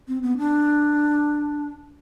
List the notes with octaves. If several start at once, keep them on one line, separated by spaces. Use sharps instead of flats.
C4
B3
D4